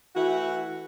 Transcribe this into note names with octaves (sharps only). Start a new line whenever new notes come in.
E3 A3 E4 F#4